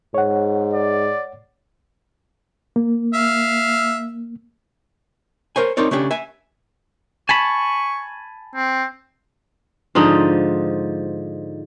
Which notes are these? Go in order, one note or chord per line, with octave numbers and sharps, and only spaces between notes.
G#2 C#5 F#5
D5
A#3
E5 F5
A#4 C5 C#5 G#5
C4 D#4 A#4 C#5 D5
C#3 A3 C#4 D4 G4
E5 G#5
G#5 A5 B5 C#6
C4
G#2 D3 F3 D#4